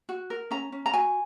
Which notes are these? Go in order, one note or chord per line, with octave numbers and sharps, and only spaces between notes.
F#4
A#4
C#4 A#5
C#4
A#5
F#4 G#5